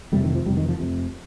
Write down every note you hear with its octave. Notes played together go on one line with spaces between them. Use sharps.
F1 F2 C3 G3
D#3
F3
F1 F2 C3 G3
D#3
F3
F1 F2 C3